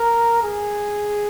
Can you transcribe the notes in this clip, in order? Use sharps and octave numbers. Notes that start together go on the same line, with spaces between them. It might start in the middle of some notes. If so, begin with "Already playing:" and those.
Already playing: A#4
G#4